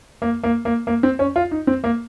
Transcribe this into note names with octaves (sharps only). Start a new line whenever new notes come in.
A#3
A#3
A#3
A#3
C4
C#4
F4
D#4
C4
A#3